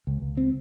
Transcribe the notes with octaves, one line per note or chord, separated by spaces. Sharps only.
C#2
C#2
C4